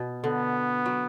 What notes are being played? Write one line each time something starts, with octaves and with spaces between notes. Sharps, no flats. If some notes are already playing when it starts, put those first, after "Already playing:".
Already playing: B2
D3 B3
F#3